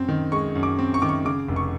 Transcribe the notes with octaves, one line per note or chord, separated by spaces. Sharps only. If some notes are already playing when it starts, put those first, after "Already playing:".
Already playing: F#2 C4
D#3
G#3 C#6
F#2
D6
C4
C#6
D#3 D6
C#6
C#3 D6
F1
C#6